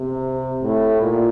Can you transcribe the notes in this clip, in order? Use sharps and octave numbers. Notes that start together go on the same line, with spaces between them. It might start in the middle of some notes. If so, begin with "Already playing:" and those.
Already playing: C3
A2
A#2